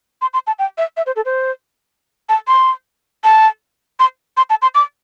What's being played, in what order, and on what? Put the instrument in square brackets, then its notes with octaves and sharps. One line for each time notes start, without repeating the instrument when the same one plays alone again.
[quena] C6
C6
A5
G5
E5
E5
C5
A4
C5
A5
C6
A5
C6
C6
A5
C6
D6